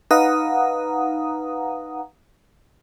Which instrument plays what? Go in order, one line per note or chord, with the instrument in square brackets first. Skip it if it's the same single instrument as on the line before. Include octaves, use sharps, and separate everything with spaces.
[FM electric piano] D#4 B4 F5 F#5 A#5 D#6